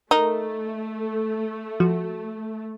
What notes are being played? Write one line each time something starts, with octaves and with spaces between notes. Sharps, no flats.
A3 D#4 A#4
F3 F#4